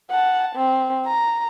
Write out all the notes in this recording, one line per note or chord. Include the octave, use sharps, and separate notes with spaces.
F#5 A5
C4
A#5